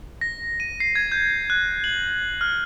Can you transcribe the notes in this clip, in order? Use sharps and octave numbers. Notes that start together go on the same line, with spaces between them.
A#6
D#7
C7
G#6
G6
F#6
F#7
F6